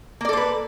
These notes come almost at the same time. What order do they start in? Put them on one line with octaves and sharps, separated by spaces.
A#3 D5 A4 C5 B4